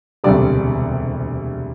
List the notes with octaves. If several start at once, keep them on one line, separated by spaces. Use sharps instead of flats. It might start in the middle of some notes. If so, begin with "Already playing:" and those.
E1 D2 C3 G3 D5